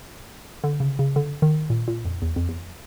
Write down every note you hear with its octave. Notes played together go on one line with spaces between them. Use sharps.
D3
C#3
C#3
D3
D#3
A#2
A#2
F2
E2
F2
E2